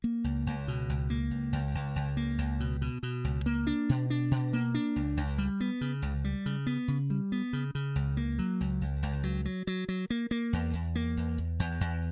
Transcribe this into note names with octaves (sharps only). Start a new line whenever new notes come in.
A#3
C#2
C#2
B2
C#2
A#3
C#2
C#2
C#2
C#2
A#3
C#2
B2
B2
B2
C#2
A#3
D4
B2
D4
B2
A#3
D4
C#2
C#2
G3
B3
C#3
C#2
G3
C#3
B3
C#3
G3
B3
C#3
C#3
C#2
A#3
F#3
C#2
C#2
C#2
F#3
F#3
F#3
F#3
A#3
A#3
E2
E2
A#3
E2
E2
E2
E2